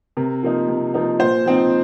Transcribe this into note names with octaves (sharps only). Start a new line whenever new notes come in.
C3 A#4
F3 A#3 D#4
C3
F3 A#3 D#4
A#2 C5
F3 C4 D#4